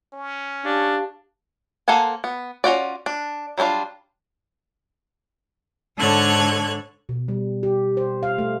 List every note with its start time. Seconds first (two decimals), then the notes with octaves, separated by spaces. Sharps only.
0.13 C#4
0.65 D4 G4 F5 A5
1.88 A#3 A4 C5 F#5 G#5
2.24 B3
2.64 C#4 F4 F#4 D5
3.06 D4
3.58 F#3 G3 C#4 D4 F4
5.97 G#2 D3 A4 C#5 F#6 G#6
7.09 B2
7.28 G3
7.63 G4
7.97 C5
8.23 F5
8.38 A3